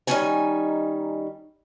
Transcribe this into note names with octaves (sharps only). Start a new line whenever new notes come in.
D#3 G3 A3 C#4 D#4 G#5